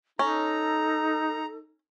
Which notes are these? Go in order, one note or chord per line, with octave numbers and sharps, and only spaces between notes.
C#4 D#4 A4 A#5